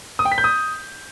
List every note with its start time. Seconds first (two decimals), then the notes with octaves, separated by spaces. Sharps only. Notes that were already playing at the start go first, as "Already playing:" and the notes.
0.19 D#6
0.25 G5
0.32 B6
0.38 G6
0.44 D#6